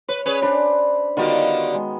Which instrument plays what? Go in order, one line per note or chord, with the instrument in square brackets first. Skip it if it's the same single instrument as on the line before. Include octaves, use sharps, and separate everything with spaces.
[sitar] B4 [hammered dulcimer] C#5
[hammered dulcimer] C#4 [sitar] G#4 B4 C#5
[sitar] D4 [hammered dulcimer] C5 B5
[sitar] D3 G3 F4 [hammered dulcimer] D#3 B3 F#4
[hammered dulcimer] G#3